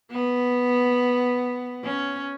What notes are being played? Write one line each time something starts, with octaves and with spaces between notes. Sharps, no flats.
B3
C#4